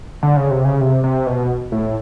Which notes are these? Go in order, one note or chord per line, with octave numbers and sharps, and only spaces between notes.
D3
C#3
C3
C#3
C3
C3
B2
A2